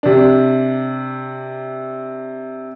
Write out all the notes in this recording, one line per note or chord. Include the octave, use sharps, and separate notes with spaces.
C3 D4